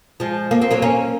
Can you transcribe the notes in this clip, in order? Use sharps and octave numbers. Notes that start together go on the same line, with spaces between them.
F3 G#3
A#3
C4
F#3 A#3
A#3 C#4